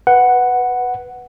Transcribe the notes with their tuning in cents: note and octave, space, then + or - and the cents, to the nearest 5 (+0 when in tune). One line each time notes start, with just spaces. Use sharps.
B4 +0 F#5 +0